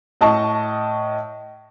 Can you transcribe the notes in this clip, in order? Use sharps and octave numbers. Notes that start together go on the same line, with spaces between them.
A2 D#5 A5 C#6